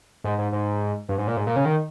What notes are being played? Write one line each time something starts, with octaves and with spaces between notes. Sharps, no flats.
G#2
G#2
G#2
G2
G#2
A#2
G#2
A#2
C#3
D#3